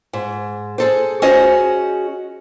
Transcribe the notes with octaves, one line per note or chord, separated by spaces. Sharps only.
G#2
G#4 A4 C5
C#4 F#4 G#4 C5 D#5